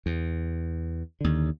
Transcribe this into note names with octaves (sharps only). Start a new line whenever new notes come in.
E2
D#2 D3